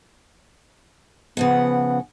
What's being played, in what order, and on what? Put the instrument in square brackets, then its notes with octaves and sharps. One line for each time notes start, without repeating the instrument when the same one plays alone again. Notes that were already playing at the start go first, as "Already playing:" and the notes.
[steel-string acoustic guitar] C#3 F3 F#5 [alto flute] B3